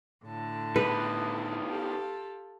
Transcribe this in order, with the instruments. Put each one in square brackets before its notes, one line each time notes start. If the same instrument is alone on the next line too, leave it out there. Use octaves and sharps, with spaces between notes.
[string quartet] A2 D3 A5
[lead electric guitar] D#3 B3 [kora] B4
[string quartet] F4 G4 A4